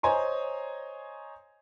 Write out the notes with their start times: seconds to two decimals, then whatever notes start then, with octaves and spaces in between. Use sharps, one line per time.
0.03 C5 C#5 D#5 G#5 A#5 C6